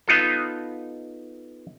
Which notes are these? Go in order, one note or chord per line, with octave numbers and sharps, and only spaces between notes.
B3 D#4 F4 A4